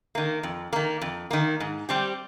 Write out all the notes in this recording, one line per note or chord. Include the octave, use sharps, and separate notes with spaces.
D#3 A#3
F2
D#3 A#3
F2
D#3 A#3
G#2
G3 C4 G4